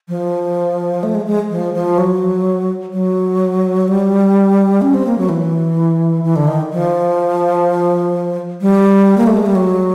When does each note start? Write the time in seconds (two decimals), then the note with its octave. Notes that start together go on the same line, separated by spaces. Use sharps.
0.09 F3
1.03 A3
1.15 G#3
1.26 G#3
1.50 F3
1.74 F3
1.98 F#3
2.93 F#3
3.88 G3
4.82 C#4
4.94 C4
5.07 A#3
5.18 F#3
5.29 E3
6.24 E3
6.36 D3
6.47 D#3
6.72 F3
8.61 G3
9.18 A#3
9.27 A3
9.37 G#3
9.46 G3
9.55 F#3